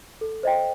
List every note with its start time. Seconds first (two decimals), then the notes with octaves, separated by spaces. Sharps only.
0.21 A4
0.43 C5 D#5 G5